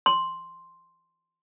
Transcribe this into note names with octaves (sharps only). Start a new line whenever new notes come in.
C6